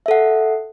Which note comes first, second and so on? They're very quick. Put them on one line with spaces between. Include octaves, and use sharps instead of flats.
E5 A4 F#5